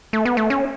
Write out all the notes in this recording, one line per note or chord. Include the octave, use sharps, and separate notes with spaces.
A3
B3
A3
C#4